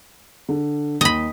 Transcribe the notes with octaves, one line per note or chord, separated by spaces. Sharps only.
D3
D#2 D#5 B5